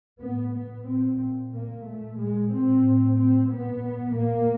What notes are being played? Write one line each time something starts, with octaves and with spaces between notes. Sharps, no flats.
A2 B3
B3
A#2 C4
A#2 A#3
A3
A#2 G#3
C4
A2
C4
A#2 B3
A#2 A#3